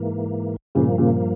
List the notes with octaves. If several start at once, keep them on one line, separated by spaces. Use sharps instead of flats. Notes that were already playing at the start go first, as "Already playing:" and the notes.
Already playing: G#2 E3 A#3
G2 A#2 C#3 F3 A#3
A#2 C#3